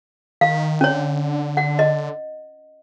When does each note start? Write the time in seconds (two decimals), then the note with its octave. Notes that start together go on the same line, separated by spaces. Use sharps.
0.41 D#3 F5
0.81 D3 C#4 C#5
1.57 F#5
1.79 D#5